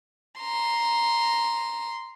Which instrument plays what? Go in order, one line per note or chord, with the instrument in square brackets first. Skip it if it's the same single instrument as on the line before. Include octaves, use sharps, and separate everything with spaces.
[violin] A#5 C6